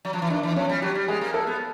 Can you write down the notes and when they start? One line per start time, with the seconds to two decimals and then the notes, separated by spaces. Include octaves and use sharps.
0.05 F#3
0.13 F3
0.22 E3
0.30 D#3 D4
0.43 E3
0.56 F3 C#4
0.69 G3
0.82 F#3 G4
0.95 G3
1.08 G#3 G#4
1.21 A#3
1.34 A#3 A4
1.47 B3